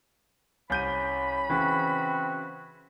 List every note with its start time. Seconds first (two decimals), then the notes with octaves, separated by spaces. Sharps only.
0.70 C2 C#4 B5 G6 D#7
1.50 C#3 E3 C4 F#4